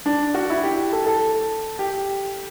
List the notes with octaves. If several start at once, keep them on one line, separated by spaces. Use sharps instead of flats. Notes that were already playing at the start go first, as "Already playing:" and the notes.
D4
F#4
E4
G4
A4
A4
G4